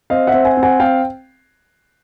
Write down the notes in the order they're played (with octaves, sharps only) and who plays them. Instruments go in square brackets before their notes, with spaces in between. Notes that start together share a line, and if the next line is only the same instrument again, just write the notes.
[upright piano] C4 [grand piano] D#5 F5
[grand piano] E5 F#5
[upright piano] C4
[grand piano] F#5 G#5
[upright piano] C4
[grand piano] F#5 G#5
[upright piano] C4 [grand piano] F5 G5